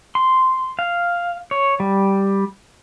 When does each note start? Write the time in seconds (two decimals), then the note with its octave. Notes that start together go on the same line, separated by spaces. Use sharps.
0.15 C6
0.79 F5
1.51 C#5
1.80 G3